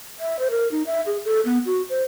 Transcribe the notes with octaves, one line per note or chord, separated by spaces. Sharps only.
E5
C5
A#4
D#4
E5
G#4
A4
B3
F#4
C5